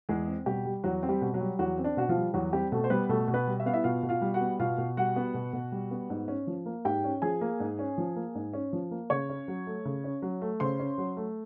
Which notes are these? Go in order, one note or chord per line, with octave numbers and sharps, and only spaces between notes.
E2 G#3 G#4
C4
B2 G3 G4
G3
E2 F#3 F#4
C4
G3 G4
B2
F#3 F#4
G3
E2 F#3 F#4
C4
D4
B2 F#4
F3 F4
G3
E2 F#3 F#4
G3 C4 G4
B2 A3 A4
C5
G3 B3 B4
B2 A3 A4
B2
B3 B4
G3
E5
B3 F5
E4 E5
B2 F4 F5
B2
F4 F5
G3
F#4 F#5
B3
B2 F4 F5
B2
G3 F#4 F#5
B3
B2
B2
G3
B3
G#2
C#4
F3
A#3
G#2 G4 G5
C#4
F3 G#4 G#5
A#3
G#2
C#4
F3
A#3
G#2
C#4
F3
A#3
C#3 C#5 C#6
C#4
F#3
A3
C#3
C#4
F#3
A3
C#3 C5 C6
C#4
F#3
A3